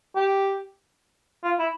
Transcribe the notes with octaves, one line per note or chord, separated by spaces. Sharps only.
G4
F4
E4